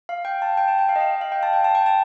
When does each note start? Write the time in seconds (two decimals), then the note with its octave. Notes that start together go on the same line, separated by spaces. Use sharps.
0.09 F5
0.25 G5
0.42 A5
0.57 G5
0.68 A5
0.79 G5
0.89 F5
0.96 D#5
1.00 F5
1.11 G5
1.21 F5
1.32 G5
1.43 A5
1.53 G5
1.64 A5
1.75 G5
1.86 A5